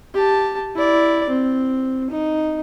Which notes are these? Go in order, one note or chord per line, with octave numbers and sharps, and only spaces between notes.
G4 A5
E4 D5
C4
D#4